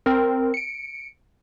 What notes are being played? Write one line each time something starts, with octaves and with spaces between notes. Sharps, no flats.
C4 A#4
C#7 D7